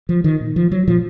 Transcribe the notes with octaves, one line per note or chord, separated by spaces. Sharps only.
F3
D#3
A#2
F3
F#3
A#2 F3